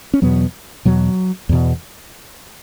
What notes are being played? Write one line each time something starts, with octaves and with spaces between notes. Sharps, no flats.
C#4
E2 B2 F#3 B3
E2 B2 F#3
E2 B2